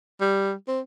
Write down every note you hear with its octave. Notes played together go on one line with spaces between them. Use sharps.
G3
C4